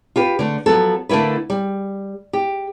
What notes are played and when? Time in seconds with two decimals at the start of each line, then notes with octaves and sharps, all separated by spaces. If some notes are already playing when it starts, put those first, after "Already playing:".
0.16 F4 G4 B4
0.39 D3 A3
0.66 F3 F#3 B3 A4
1.09 D3 A3 A#3 E4 B4
1.50 G3
2.33 G4